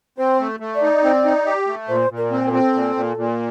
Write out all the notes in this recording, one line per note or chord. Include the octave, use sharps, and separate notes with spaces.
C4 C5
A3
A3
D5
D#4
C4
D#4
G4
A3
A#2 C5
A#2
A#4
C4
A#4
C4 A4
A#2
A#2
A#2